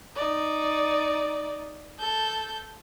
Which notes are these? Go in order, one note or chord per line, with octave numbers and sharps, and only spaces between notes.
D#4 D5
A4 G6